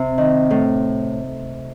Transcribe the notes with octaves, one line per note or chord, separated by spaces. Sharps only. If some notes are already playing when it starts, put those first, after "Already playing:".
Already playing: C3
D#3
A2